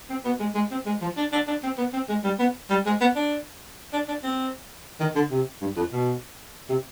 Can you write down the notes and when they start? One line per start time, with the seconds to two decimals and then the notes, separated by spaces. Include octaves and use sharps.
0.09 C4
0.25 B3
0.40 G#3
0.55 G#3
0.71 C4
0.86 G#3
1.01 F3
1.17 D4
1.32 D4
1.48 D4
1.63 C4
1.78 B3
1.93 C4
2.09 G#3
2.24 G3
2.39 B3
2.70 G3
2.86 G#3
3.01 B3
3.16 D4
3.93 D4
4.08 D4
4.23 C4
5.00 D#3
5.15 D3
5.31 C3
5.61 G2
5.76 F2
5.92 B2
6.69 C3